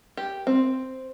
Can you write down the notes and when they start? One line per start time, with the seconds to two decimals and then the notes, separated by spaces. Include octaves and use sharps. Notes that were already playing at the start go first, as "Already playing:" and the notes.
0.17 G4
0.47 C4